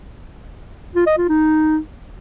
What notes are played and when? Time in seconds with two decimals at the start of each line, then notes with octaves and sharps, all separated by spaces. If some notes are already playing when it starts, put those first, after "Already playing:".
0.96 F4
1.07 D#5
1.18 F4
1.29 D#4